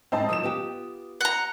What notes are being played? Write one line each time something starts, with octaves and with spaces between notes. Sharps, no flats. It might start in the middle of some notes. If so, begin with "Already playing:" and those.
G#2 C4 D#4 C5 A5
D#3 F3 F#3 D#6 E7
B3 F4 G4
F#5 A#5